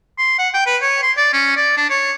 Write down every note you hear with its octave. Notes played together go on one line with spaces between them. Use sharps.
C6
F#5
G5
B4
C#5
C6
D5
C#4
D5
D4
C#5